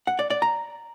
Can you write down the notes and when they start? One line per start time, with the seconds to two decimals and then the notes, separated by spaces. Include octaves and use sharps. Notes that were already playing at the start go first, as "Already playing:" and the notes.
0.07 F#5
0.19 D5
0.30 D5
0.42 A#5